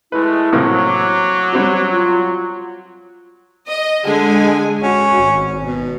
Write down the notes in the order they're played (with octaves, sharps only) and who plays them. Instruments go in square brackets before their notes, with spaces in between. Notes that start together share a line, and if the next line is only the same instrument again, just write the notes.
[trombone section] G#3 A3 [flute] E4 [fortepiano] B4
[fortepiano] A2 C3 A#3 [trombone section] F#3
[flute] D6
[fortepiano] G3 C4 F#4
[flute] F4
[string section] D#5
[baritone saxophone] D3 [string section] G#3 G#5
[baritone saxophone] C#4 [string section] F#4
[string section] G#1
[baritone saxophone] B2